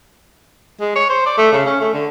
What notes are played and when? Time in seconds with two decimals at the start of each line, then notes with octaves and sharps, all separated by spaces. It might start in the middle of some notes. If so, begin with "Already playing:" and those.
0.81 G#3
0.96 C#5
1.10 C5
1.26 D5
1.38 A3
1.53 C#3
1.66 C#4
1.81 A3
1.93 D3